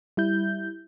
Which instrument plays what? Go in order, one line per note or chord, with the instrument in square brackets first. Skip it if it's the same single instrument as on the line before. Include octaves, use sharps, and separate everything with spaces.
[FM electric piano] G3 E4 G6